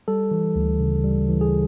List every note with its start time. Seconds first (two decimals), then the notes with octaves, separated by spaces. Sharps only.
0.08 G3 A4
0.31 E3
0.56 D2
0.80 C#3
1.04 G3
1.29 E3
1.41 G#4